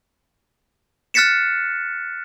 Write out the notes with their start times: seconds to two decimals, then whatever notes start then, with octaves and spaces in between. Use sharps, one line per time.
1.14 F6 F#6 A6 B6 C#7 E7